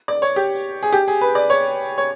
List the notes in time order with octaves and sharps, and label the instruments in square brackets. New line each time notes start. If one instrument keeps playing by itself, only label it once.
[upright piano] D5
C#5
G4
G#4
G4
G#4
B4
D5
C#5
C#5